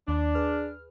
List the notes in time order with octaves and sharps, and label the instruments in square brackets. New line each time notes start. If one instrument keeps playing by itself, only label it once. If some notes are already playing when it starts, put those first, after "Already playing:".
[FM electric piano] D#2 [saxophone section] D4
[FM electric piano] G#4 B4 F6